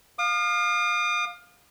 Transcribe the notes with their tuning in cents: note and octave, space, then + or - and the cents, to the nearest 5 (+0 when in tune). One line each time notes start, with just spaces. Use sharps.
F5 +15 D#6 -45